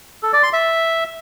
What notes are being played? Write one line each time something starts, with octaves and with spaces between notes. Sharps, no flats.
A4
D5
C6
E5